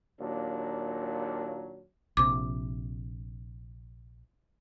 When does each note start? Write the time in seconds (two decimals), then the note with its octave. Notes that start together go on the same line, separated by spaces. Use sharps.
0.20 D#2 A#2 F#3 D4
2.17 A#1 C3 D6